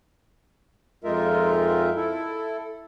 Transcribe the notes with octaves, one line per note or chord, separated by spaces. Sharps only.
F2 G#3 D#4 F4 A#4 E5
E4 A4